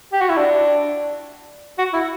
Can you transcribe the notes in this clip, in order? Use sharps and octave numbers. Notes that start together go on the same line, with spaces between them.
G4
F#4
E4
D4
F#4
E4